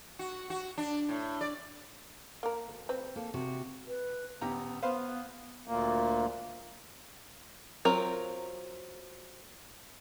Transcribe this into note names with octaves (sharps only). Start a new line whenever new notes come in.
F#4
F#4
D4
A2
D5
A#3 A#4
D2
C4 B4
A#3 A4
C3 F#4
B4
D#1 B3 G4 A#5
B3 B4 C5 F5
D2 A#2 A#3
F#3 C4 F4 A#4 A#5